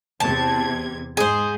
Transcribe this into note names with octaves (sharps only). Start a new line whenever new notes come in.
E2 C3 A5 G#6
G#2 G#4 C5